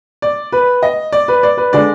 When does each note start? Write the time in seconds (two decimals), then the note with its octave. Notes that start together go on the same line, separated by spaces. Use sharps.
0.22 D5
0.52 B4
0.83 D#5
1.13 D5
1.28 B4
1.43 D5
1.57 B4
1.73 D3 G#3 D4 D5